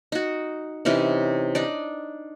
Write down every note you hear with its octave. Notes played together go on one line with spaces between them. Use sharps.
D#4 F#4
C3 E3 C#4 D#4
D4 D#4 D5